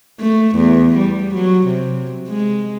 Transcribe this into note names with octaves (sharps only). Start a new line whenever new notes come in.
A3
E2
G3
F#3
C3
G#3